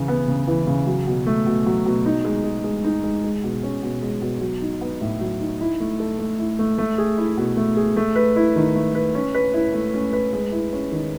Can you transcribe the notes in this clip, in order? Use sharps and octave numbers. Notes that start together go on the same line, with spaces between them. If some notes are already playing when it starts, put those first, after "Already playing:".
Already playing: C#3 E3
B3
C#3
E3
C#3
F#3
B2
A3
B2
F#3
B2
D#4
G#3
G#4
G#3
D#4
G#3
G#3
B2
C#4
B2
G#3
B2
F#3
D#4
B3
A2
F#3
D#4
E4
A3
A4
A3
E4
A3
A3
G#4
E4
B2
A3
G#4
A3
B4
E4
D#3
A3
B4
C#4
B4
E4
A3
C#4
B4
G#3
E4
C#4
D#3